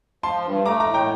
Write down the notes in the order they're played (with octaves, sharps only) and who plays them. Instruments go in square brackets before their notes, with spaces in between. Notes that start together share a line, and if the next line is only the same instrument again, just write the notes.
[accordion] F3 [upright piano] A5 C6
[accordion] G2
[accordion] A3 [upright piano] A#5 D6
[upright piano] A#5 D6
[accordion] A2
[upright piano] G5 A#5